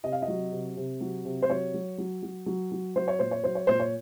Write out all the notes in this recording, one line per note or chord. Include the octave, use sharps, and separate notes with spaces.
C3 D#5
F5
D#5
F#3
C3
C3
F#3
C3
C5
F#3 C#5
F#3
F#3
F#3
F#3
F#3
F#3 C5
C#5
A#2 C5
C#5
F#3 C5
C#5
A#2 C5
C#5